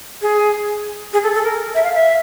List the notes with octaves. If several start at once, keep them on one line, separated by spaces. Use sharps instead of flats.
G#4
G#4
A4
A4
A#4
E5
F5
E5